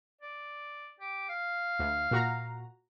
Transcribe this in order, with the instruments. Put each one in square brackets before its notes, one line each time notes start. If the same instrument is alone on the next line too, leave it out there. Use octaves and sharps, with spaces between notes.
[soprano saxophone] D5
G4
F5
[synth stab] D2
A#2 F#4 A#5